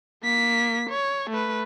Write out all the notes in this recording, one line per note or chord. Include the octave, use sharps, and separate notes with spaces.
A#3 B6
C#5
A3 B4